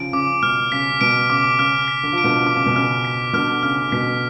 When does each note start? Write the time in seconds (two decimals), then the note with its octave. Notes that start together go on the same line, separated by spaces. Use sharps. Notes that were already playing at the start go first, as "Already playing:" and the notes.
Already playing: C#3 F3 D7
0.13 C#3 D6
0.43 B2 F6
0.72 C#3 B6
1.01 B2 D7
1.30 C#3 D6
1.59 C#3 F6
1.88 B6
2.03 D3
2.13 F3
2.18 D7
2.23 B2 D3
2.46 D3 D6
2.56 C#3
2.66 B2
2.76 C#3 F6
3.05 B6
3.33 B2 D3 F6
3.63 C#3 F6
3.92 B2 B6